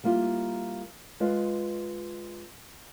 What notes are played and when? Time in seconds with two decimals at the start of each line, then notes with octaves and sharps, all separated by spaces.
0.04 G3 A#3 E4 F4
1.20 G#3 F4 B4 D#5